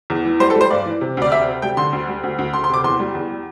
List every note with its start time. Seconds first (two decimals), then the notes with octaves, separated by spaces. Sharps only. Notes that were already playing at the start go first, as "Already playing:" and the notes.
0.10 E2
0.25 E3
0.40 G3 C5
0.50 A4
0.56 G3 C5
0.70 G2 D5
0.86 E3
1.01 C3
1.17 D2 D5
1.32 C3 E5
1.47 C3
1.62 G3 G5
1.77 D3 C6
1.93 D2
2.08 G3
2.23 D2
2.39 D2
2.53 D2 C6
2.64 C6
2.69 C3 D6
2.84 E2 C6
2.99 G3
3.15 E2
3.31 G3